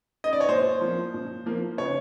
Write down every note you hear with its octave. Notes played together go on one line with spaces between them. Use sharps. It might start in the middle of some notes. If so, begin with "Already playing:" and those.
D#5
D5
C#5
A#2 C5
F3 A#3
A#2
F3 A#3
C#3 C#5